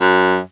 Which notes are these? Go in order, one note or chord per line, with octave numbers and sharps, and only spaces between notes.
F#2